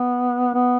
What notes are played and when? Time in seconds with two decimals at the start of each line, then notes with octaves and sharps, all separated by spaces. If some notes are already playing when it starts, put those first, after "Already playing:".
Already playing: B3
0.54 B3